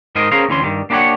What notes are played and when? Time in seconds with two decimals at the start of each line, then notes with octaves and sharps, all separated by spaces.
0.15 G#2 D#4 A#4 C5 D#5
0.32 C#4 G#4 A#4 C5 F5
0.49 D2 E3 C#4 C6
0.62 G2 D#3 G3
0.90 A#3 D4 G4 A#4 C#5 F#5